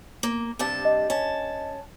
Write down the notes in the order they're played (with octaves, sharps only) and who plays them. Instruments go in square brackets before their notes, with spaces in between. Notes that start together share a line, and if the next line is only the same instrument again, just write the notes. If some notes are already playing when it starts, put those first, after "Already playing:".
[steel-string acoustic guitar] A#3
G2 C3 A5
[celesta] D#5
[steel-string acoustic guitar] C#4 A5